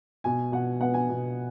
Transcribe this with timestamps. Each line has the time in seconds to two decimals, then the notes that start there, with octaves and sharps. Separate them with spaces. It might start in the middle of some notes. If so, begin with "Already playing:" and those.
0.24 B2 G#5
0.52 B2 F#5
0.81 B3 F#5
0.94 G#5
1.09 B2